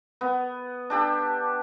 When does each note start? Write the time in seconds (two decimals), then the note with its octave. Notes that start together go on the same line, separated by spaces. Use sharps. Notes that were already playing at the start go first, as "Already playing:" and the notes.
0.21 B3
0.90 D4 G4 A4